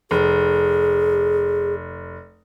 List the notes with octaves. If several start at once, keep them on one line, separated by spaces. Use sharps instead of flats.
F1 G#4